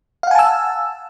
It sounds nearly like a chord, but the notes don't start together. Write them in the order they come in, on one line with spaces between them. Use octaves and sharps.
F5 F#5 G#5 A5 E6